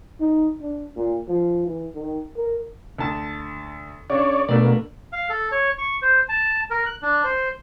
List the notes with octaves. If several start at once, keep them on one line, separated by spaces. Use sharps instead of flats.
D#4
D4
A#2
F3
E3
D#3
A#4
D2 A5
C#3 D4 C#5 D5
B2 A3 A#3 D4 D5
F5
A4
C#5
C#6
C5
A5
A#4
F#6
D4
C5